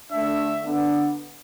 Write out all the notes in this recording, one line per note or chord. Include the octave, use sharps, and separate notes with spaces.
D3 A3 D4 E5
D3 B3 D4